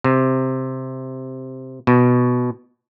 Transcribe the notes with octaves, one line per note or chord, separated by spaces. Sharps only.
C3
B2